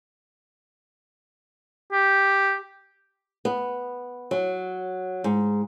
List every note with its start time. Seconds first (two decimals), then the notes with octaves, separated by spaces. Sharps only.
1.92 G4
3.45 B3
4.31 F#3
5.24 G#2